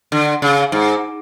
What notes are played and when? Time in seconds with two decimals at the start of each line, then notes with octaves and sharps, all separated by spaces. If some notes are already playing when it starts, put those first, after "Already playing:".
0.12 D3
0.42 C#3
0.72 G#2